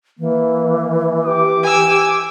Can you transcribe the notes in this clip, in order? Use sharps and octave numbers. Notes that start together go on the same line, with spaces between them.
E3 A#3
G4 D6
G#5 E6